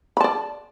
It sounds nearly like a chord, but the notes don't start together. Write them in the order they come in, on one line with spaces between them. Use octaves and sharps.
B5 A5 D5